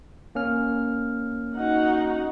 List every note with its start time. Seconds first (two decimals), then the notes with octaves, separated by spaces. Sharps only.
0.35 A#3 C#4 F6
1.56 D#4 F#4 F#5